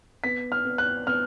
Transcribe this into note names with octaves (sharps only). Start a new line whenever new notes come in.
B3 B6
F6
B3
F#6
B3 F6